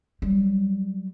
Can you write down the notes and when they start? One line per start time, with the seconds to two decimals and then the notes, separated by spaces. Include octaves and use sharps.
0.22 F#3 G3